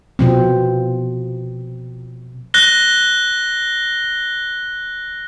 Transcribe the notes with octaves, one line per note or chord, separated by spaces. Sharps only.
B2 F3 C4
F#6 A#6 G7